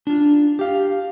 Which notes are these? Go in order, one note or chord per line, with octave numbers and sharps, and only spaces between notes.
D4 F4
G4 F5